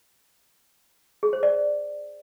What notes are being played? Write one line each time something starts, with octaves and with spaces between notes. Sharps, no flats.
G#4
C5
D5